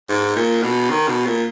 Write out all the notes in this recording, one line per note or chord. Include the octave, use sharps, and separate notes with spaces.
G#2
A#2
B2
D#3
B2
A#2